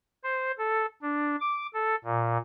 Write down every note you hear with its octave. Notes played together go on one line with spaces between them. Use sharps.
C5
A4
D4
D6
A4
A#2